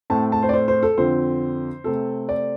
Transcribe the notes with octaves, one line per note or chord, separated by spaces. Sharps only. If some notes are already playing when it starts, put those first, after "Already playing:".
A2 A3 C4 A5
A5
C5
D5
C5
C5
A4
F2 D3 F3 C4 C5
C3 A3 C4 A4
D5